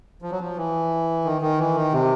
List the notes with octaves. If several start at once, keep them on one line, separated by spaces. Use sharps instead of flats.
F3
F#3
F3
E3
D#3
D#3
E3
D#3
C3